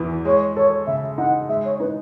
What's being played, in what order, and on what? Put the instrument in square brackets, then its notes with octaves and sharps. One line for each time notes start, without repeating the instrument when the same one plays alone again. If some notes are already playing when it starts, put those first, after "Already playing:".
Already playing: [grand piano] E2 E3
[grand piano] G#3 [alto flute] C#5
[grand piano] A4 [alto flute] C#5
[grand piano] C#3 [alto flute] E5
[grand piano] D#4 [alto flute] F#5
[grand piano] G#3 [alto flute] E5
[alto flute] C#5
[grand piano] D#4 [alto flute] B4